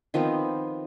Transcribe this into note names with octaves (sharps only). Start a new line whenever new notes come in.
D#3 F3 B3 C4